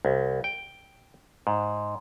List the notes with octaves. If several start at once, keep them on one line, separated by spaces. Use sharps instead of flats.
C2
G5
G#2